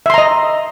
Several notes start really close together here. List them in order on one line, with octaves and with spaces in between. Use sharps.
E5 C6 A#5 D#5